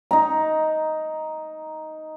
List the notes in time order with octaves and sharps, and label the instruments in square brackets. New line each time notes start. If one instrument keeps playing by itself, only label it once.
[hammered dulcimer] D#4 A#5